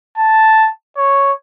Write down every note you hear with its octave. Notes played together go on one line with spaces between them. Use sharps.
A5
C#5